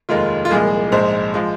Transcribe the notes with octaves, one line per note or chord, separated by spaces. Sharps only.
F1 D#2 D#3 G#3 F4
F4
C2 A#2 F3 G#3 G#4
A#1 G#2 G#3 C5
F3 G#3